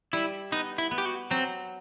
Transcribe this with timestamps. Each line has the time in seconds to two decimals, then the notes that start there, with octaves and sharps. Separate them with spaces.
0.13 G3 E4
0.52 B3 D#4
0.78 E4
0.91 B3
0.98 G4
1.05 F#4
1.31 F#3 C4